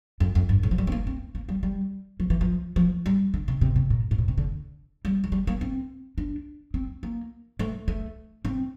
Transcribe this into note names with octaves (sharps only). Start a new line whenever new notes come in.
F2
F2
G2
A2
F3
G3
C4
A#3
C4
A#3
G3
G3
F3
E3
F3
F3
G3
D3
C3
C3
C3
A#2
A2
A#2
C3
D3
G3
F3
G3
A#3
C4
D4
C4
A#3
A3
A3
C4